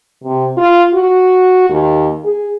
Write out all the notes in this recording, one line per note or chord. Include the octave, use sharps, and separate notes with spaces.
C3
F4
F#4
D#2
G#4